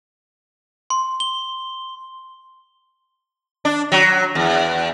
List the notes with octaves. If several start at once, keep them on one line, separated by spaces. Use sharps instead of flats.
C6
G7
D4
F#3
E2